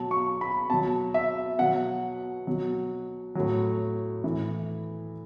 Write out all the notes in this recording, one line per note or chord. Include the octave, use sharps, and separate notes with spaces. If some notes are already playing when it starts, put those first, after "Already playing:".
Already playing: B2 F#3 A5
C#6
B5
B2 F#3 A5
E5
B2 F#3 F#5
B2 F#3
A2 F#3
A2 E3